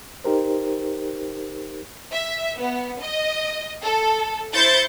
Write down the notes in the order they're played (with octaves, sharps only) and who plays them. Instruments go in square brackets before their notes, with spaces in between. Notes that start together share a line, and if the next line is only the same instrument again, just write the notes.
[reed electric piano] D#4 G4 A#4 C5
[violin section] E5
B3
D#5
A4
E4 C5 G6 A6 C#7